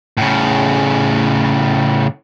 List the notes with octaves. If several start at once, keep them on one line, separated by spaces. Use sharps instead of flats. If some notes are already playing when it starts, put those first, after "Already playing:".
A2 C#3